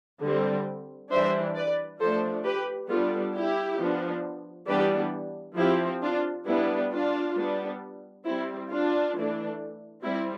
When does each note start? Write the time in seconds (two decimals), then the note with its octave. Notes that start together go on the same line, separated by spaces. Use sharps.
0.22 D3 G3 C4
1.11 E3 G3 D4 C5 E5
1.55 B4 D5
2.00 F3 A3 D4 A4 C5
2.45 G4 B4
2.90 G3 B3 D4 F4 A4
3.34 E4 G4
3.79 F3 B3 D4
4.68 E3 G3 B3 D4 G4 B4
5.57 F3 C4 E4 G4
6.02 D4 F4
6.46 G3 B3 D4 E4
6.91 D4 F4
7.36 G3 B3 D4
8.25 G3 C4 E4
8.70 D4 F4
9.15 E3 A3 D4
10.04 G3 C4 E4